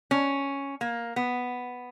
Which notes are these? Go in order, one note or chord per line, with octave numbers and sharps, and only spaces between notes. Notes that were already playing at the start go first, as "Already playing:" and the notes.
C#4
A#3
B3